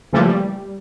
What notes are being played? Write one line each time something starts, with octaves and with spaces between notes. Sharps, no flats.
C#3 E3 F3 G3 A3 A#3
G3